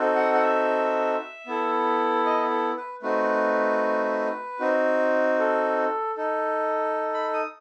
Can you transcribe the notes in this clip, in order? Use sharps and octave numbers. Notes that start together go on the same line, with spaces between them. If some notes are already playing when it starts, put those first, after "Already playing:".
Already playing: C4 D#4 F#4 A4
F#5
F#5
E5
B3 E4 A4
D#5
A4
B4
A3 C4 D#4 F#4 B4
C4 D#4 F#4
A4
D#4 A4
B5
D#6